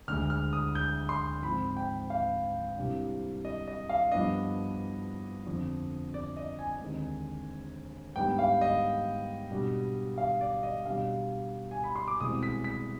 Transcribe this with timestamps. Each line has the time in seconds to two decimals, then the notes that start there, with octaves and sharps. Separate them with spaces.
0.08 D2 D3 G#3 F6
0.30 F6
0.53 D#6
0.75 G6
1.09 C6
1.42 G#2 F3 C4 B5
1.77 G5
2.10 F5
2.77 C2 C3 G3 D4
3.45 D#5
3.67 D#5
3.89 F5
4.12 G2 F3 B3 D4 D#5
5.46 F2 D3 F3
6.14 D5
6.36 D#5
6.59 G#5
6.81 D#2 D3 G#3 C4
8.16 G#2 G3 B3 D4 G5
8.39 F5
8.61 D#5
9.51 B2 G3 D4
10.18 F5
10.41 D5
10.63 D#5
10.85 B2 G3 D4 F5
11.71 G#5
11.84 B5
11.96 C6
12.08 D6
12.21 C2 B2 G#3 C4 D#6
12.43 B6
12.64 B6